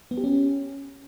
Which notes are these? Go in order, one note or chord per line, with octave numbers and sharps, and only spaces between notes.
B3
G4
C#4